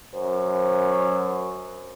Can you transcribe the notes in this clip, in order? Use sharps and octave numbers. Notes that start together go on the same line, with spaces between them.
F#2 C5